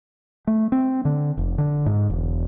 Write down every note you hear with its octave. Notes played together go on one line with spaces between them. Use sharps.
A3
C4
D3
F1
D3
G#2
E1